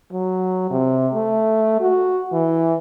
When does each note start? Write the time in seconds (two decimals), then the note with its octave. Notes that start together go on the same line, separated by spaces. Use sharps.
0.13 F#3
0.71 C3
1.14 A3
1.81 F#4
2.32 E3